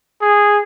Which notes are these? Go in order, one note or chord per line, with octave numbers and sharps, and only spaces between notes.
G#4